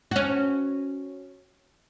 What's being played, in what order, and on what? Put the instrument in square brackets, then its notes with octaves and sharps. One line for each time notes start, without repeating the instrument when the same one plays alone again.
[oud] C#4 F#4